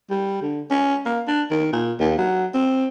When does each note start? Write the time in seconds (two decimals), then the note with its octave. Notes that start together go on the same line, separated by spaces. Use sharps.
0.10 G3
0.42 D3
0.70 C#4
1.05 A#3
1.27 D4
1.51 D#3
1.73 A#2
2.00 D#2
2.18 F#3
2.54 C4